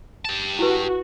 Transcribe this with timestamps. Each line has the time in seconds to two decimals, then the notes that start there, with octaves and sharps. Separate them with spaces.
0.25 G4 A5
0.59 E4 F#4 B4